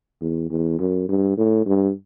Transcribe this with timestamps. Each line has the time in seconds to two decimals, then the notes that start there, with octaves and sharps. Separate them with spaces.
0.21 E2
0.50 E2
0.79 F#2
1.09 G2
1.37 A2
1.66 G2